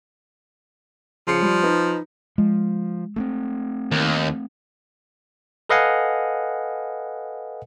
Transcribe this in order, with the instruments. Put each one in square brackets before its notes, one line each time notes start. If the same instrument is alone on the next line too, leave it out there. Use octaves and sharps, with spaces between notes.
[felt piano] C#3 C7 C#7 [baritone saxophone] F3
[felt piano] G3
D#4 B4
[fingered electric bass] F3 [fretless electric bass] G#3
[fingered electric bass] A3 B3 C4
[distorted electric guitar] D#2
[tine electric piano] A4 B4 D#5 F5 F#5 G#5